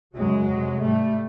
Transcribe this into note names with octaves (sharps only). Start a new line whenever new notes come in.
F#2 C#3 F#3 G#3
F2 C3
G#2 G3 A3